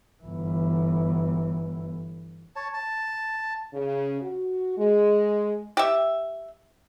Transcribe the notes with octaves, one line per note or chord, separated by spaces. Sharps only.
G1 E3
C#5 A5
A5
C#3
F#4
G#3
G4 E5